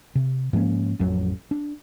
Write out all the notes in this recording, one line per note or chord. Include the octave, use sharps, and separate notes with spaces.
C3
G#2 F3 A#3 C#4
A1 F2 F#3
D4